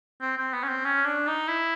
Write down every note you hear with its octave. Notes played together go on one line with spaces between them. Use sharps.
C4
C4
B3
C#4
C4
C#4
D4
D#4
E4